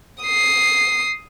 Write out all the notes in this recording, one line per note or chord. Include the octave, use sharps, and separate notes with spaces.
D#6 C7